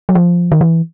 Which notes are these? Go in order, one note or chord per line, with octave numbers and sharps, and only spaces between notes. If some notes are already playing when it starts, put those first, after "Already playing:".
F#3
F3
D#3
E3